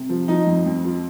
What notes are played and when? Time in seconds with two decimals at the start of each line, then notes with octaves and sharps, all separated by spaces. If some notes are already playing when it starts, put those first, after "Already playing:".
Already playing: C3
0.09 F3
0.28 F3 D#4
0.47 F2
0.66 F2
0.84 F3